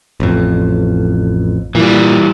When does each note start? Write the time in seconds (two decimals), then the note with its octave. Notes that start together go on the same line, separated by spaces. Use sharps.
0.20 A1 F2
1.75 A#2 E3 G3